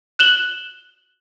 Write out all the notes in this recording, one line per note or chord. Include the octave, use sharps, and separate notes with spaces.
F#6 E7 F#7 G7